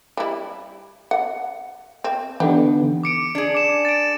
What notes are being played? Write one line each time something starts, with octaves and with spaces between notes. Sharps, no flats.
G3 E4
F#5
C4
D3 E3 B3 D#4 G4
D6 C#7 D7
D4 G#4
D6 E7
A6 D7